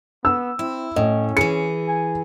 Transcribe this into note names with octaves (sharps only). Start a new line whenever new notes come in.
B3 E6
C4 E4
A2 C#4 D#5
E3 G#4 C#7
G#5